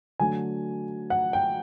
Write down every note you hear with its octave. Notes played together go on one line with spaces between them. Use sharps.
D3 F#3 A3 G#5
F#5
G5